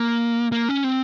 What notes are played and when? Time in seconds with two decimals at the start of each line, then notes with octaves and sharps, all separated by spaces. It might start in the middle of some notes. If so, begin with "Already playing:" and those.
Already playing: A#3
0.52 A#3
0.69 C#4
0.84 C4